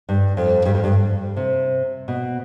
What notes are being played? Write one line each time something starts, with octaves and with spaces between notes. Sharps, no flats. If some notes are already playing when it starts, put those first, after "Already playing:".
G2
F2
G2
F2
G2
C3
B2